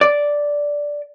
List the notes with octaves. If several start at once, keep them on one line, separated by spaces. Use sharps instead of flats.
D5